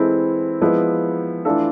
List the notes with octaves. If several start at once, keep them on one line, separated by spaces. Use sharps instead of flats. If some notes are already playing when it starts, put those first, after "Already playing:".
Already playing: E3 G#3 C4 E4 A4
F3 G#3 B3 E4
E3 A3 D4 F4 A4